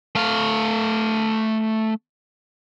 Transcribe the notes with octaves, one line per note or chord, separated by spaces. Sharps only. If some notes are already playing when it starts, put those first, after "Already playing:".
A3 F5